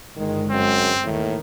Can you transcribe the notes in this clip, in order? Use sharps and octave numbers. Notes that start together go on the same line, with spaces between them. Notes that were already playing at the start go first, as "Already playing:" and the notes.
G1 D#3 G#3
F#2 C4
D#2 A2 D#3